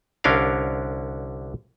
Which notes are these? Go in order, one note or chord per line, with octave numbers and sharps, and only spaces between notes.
C2 D3 C#4 D4 A#4 F5